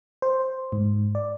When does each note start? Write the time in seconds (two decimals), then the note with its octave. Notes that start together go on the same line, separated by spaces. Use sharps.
0.22 C5
0.72 G#2
1.15 D5